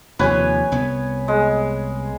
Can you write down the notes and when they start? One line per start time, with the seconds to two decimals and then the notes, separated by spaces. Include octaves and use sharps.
0.19 D#2 C3 F3 B4 C#5 G#5
0.72 C2 B3
1.28 G#3